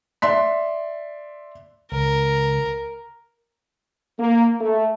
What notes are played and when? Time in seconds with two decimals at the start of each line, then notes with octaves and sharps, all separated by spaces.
0.22 D5 E5 C6 B6
1.92 C#2 A#4
4.19 A#3
4.60 A3